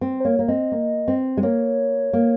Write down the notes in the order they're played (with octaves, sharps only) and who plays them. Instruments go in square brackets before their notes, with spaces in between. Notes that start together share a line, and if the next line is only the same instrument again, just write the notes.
[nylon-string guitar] C4
[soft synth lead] C5
[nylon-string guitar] A#3 [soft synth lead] C#5
[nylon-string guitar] A#3
[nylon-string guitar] C4 [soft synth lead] D#5
[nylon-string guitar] A#3
C4
G#3
[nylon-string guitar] A#3 [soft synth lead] C#5
[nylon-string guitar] A#3